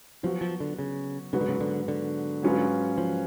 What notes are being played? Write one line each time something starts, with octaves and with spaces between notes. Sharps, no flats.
F3 F#3 B3 F#4
F3
D3
C#3
G#2 C#3 F#3 B3 F#4 B4
D3
C#3
D3
D3
G#2 F#3 C#4 F4 B4
F3